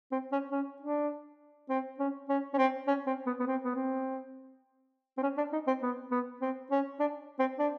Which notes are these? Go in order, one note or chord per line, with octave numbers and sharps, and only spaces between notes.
C4
C#4
C#4
D4
C4
C#4
C#4
C#4
C4
C#4
C4
B3
B3
C4
B3
C4
C4
C#4
D4
D#4
C4
B3
B3
C4
C#4
D4
C4
D4